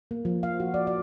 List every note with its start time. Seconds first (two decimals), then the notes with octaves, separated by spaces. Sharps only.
0.11 A#3
0.25 F3
0.43 F5
0.60 F#4
0.74 D5
0.87 D5